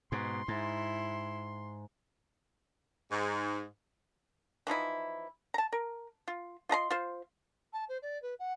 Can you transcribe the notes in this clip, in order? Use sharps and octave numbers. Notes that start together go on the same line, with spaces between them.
G#2 B2 C6
G#2 E4
G#2
E3 F3 D#4 E4
A5 A#5
A#4
F4
F4 D#5 A#5 C6
F4 C5
A5
C5
D5
B4
F#5